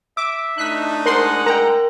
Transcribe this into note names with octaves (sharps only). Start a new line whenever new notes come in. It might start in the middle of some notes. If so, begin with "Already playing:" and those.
E5 D6 E6 D7
A2 D4 D#4 F#6 B6
G#3 A#4 C5 F#5 C6 F#6
A#4 G5 A#5